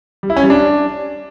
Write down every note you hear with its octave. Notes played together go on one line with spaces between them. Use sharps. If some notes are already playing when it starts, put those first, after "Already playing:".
G3
E4
C#4
G3
D4